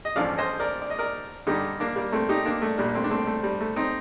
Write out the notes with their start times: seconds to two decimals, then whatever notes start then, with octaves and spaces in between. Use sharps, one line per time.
0.05 D#5
0.16 A1 G2 F3 D5 F5
0.37 C5 D#5
0.60 A#4 D5
0.82 D5
0.90 D#5
0.99 A#4 D5
1.47 G2 D3 G3 D#4 G4
1.80 A#3 D4
1.96 G3 A#3
2.12 A3 C4
2.29 D#4 G4
2.45 A#3 D4
2.62 A3
2.78 A#1 A#2 G3 A#3
2.95 A3 C4
3.04 D4
3.11 A3 C4
3.27 A3
3.43 G3
3.61 A3
3.76 C4 D#4